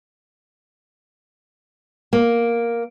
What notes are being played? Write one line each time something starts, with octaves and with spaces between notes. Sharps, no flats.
A#3